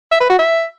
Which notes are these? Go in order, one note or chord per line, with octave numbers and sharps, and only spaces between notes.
E5
B4
F#4
E5